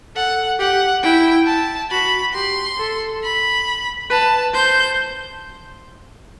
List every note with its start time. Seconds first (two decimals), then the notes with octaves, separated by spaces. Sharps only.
0.16 A4 F#5
0.59 G4 F#5
1.03 E4 G5
1.47 A5
1.90 F#4 B5
2.34 G4 C6
2.78 A4
3.23 B5
4.10 B4 A5
4.53 C5 G6